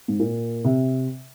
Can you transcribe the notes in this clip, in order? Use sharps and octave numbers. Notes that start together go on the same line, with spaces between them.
G#2
A#2
C3